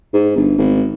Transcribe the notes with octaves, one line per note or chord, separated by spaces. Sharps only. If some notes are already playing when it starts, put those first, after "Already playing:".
G#2
G1
G#1